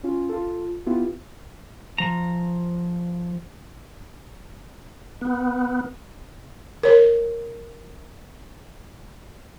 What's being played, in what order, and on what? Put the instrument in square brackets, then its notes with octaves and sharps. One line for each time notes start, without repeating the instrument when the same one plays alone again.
[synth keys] C#4 F4
F4 A4
B3 E4 F4 G4
[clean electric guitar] F3 A#5
[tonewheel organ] B3
[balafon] A#4 C#5